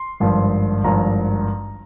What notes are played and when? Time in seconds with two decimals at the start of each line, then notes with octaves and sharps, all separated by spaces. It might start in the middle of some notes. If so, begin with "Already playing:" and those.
Already playing: C6
0.20 G#1 G2 F3
0.84 G#1 G2 F3 A#5